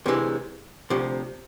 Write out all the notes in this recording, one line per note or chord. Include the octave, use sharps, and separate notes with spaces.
D2 C3 E3 G#3
D2 C3 F3